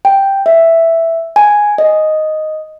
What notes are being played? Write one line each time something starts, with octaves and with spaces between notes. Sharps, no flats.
G5
E5
G#5
D#5